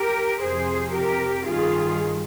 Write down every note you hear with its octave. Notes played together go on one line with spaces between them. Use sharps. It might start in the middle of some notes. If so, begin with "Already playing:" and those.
Already playing: G4 A#4
F2 C3 F3 G#4 C5
G4 A#4
G2 D#3 F4 G#4